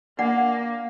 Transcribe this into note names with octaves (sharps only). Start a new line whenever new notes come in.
A#3 D4 D5 F#5